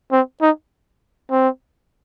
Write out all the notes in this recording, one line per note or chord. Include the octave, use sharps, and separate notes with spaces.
C4
D#4
C4